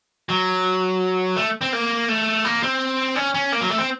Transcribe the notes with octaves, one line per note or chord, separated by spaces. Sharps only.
F#3
A3
C4
A#3
A3
A#3
C4
C#4
C#4
A#3
F#3
A3
C4